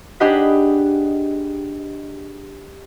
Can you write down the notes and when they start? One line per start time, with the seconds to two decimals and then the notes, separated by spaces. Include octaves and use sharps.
0.20 D4 G4 G#4 D#5 F#5 B5